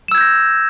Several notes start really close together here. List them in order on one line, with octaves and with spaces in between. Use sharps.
E7 E6 G#6 G6 A#6